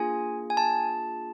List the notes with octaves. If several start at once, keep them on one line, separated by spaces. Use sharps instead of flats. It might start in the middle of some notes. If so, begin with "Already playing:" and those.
Already playing: A#3 D4 F4 G#4 G#5
G#5
A5